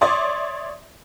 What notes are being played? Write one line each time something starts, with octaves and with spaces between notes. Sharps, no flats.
C#5 D5 E5 C6 D6 D#6